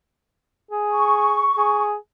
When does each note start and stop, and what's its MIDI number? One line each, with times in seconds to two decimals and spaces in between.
0.71 1.50 68
0.91 1.84 85
1.57 1.95 68